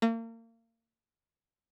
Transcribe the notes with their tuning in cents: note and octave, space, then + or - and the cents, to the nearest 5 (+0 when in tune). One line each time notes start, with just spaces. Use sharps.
A#3 -35